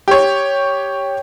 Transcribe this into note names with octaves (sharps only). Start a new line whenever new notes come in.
G4 C#5